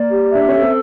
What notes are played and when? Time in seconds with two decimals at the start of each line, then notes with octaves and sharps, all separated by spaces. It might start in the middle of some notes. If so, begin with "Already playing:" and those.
Already playing: A#3 D5
0.10 G4
0.31 D4 E5
0.49 C#4 A4
0.62 C4